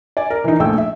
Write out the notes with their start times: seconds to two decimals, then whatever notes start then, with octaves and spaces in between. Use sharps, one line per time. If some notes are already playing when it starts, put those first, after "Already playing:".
0.17 D5 G#5
0.30 A#4
0.44 E3 D#4
0.60 A#1 A3 G5 E6
0.78 E5